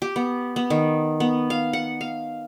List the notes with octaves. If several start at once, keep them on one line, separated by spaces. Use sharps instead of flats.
G4
B3
B3
D#3
B3
F5
F#5
F5